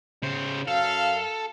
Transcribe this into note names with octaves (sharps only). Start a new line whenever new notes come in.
C#3 C5
F#2 A4 F5